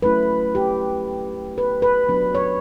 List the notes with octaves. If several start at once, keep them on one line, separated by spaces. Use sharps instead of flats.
F#3 A3 C#4 E4 B4
G4
B4
B4
F#3 B3 D4
C#5